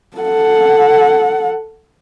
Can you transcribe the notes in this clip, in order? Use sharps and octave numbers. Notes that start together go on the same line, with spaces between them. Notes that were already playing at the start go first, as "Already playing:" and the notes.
A4 F#5